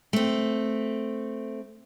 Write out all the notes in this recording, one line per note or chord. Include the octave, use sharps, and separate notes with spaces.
A3 C4